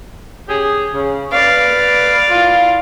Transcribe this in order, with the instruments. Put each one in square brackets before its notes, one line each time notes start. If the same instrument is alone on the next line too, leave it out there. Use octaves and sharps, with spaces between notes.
[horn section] C#4 G4 G#4
C#3
[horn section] B4 [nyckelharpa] D5 F5
[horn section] E4 F4